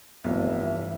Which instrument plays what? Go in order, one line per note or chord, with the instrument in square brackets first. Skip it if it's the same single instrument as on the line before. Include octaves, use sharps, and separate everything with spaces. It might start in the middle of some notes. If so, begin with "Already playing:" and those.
[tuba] F1 [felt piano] B1 [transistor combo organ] G2 E3 [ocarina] E5